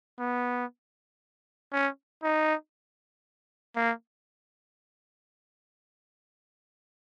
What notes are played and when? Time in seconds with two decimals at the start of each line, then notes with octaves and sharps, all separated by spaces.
0.19 B3
1.73 C#4
2.23 D#4
3.76 A#3